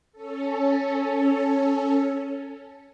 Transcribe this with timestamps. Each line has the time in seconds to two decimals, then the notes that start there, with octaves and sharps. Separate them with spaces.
0.12 C#4 A4